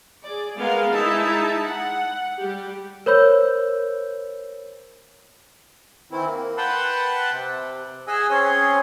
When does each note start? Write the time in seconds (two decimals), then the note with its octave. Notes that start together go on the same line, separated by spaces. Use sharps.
0.25 G#4 D5
0.57 G#3 B3 A#4 F5
0.93 G#3 D#4 E4 E5 A5
1.64 F#5
2.40 G3 G4
3.06 A#4 C5 C#5 B5 E6 G6
6.12 D#3 E3 C4 E4
6.25 A#3
6.58 B4 F#5 G5 A5 B5 C6
7.32 C3
8.08 G#4 D#5 F#5 G#5 E6
8.30 C4 C#4 G#4 C#5 C6